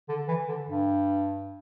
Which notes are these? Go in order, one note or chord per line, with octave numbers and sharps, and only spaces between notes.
D3
E3
D3
G2